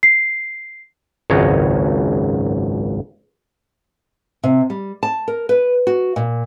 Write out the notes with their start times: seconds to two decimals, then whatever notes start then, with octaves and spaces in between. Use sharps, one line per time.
0.03 C7
1.30 G#1 C#2 F#2 C#5 D#5
4.43 C3
4.70 G3
5.03 A5
5.28 A#4
5.49 B4
5.87 F#4
6.16 A#2